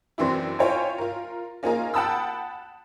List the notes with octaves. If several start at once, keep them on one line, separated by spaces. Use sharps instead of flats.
F#2 E3 C4 D4 E4
E4 F4 C#5 G5 G#5
F4 A#4
A#3 C#4 D#4 F4 G#4 A#4
F#5 G5 A5 B5 D#6 E6